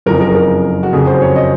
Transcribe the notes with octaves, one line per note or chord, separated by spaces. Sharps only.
F#1 F2 C#3 F3 A#4
A#4
A#4
F#4
F#1 F2 C#3 F#3 G#4
C5
C#5
D#5